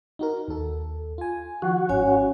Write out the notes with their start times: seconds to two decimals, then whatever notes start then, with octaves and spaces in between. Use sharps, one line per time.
0.19 D#4 F#4 A#4
0.48 D#2 A4
1.18 F4 G#5
1.62 D#3 F3 F#4
1.89 G#1 G#2 C#4 C#5 G#5